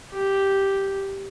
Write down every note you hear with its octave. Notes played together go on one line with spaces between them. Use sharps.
G4